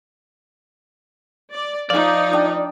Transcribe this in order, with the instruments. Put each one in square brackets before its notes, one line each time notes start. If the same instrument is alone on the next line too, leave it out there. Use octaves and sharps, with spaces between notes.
[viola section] D5
[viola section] F3 D#4 [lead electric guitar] D5 [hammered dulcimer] F5 D6
[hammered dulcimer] D4 D#5 G5